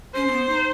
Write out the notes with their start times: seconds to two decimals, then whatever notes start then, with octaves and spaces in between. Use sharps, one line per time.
0.15 C#4 C5
0.27 C4
0.32 B3
0.49 D#4